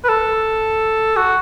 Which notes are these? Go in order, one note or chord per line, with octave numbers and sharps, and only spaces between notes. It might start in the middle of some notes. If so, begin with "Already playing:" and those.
B4
A4
F#4